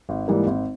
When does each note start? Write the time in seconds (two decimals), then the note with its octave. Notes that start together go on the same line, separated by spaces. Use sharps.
0.09 G#1
0.28 G#2 E3 G3 A#3
0.47 G#1